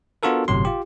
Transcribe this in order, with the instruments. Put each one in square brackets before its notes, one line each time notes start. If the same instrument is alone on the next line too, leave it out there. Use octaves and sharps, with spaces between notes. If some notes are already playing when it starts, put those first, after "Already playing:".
[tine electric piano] B3 D4 F4 F#4 A4 A#4
G1 A2 C3 F#3 C6
F4 G4